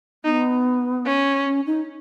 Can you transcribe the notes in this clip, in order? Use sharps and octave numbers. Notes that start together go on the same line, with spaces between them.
B3 D#4
C#4
C#4
D#4